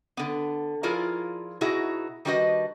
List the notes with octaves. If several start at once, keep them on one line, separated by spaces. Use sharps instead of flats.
D3 B3
F3 E4 F4 G#4 A#4 D5
B2 D#4 E4 F#4 G#4
D#3 G3 D4 F#4 B4 D#5